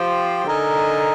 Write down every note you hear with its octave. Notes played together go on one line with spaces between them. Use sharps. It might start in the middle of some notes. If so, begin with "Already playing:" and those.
Already playing: F3 G4 C5 G5
D3 D#4 A#4 D#5 G#5